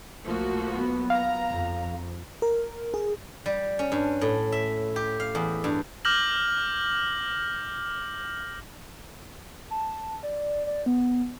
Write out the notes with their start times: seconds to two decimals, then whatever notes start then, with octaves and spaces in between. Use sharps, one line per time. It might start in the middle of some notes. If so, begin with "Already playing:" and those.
0.25 B1 F3 A3 A#3 F#4
0.69 F#3 B3
1.10 F5 A#5
1.49 F2
2.42 A#4
2.94 G#4
3.46 G3
3.79 C#4
3.92 G2
4.21 A2
4.52 E5
4.96 G4
5.20 F5
5.35 E2
5.64 G2
6.05 D6 F6 G6 A#6 F#7
9.70 A5
10.23 D5
10.67 D5
10.86 B3